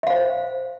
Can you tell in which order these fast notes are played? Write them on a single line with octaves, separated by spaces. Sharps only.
E5 F5 C5